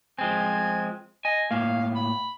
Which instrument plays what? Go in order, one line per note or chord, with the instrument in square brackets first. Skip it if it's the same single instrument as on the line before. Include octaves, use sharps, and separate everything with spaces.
[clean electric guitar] F3 G#3 C4 [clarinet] G#5
[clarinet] D#5 [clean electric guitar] G#5
[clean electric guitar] A2 A#3 [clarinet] F5
[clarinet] B5